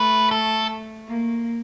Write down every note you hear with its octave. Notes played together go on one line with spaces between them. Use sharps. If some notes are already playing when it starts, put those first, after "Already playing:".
Already playing: A3 B4
A4
A#3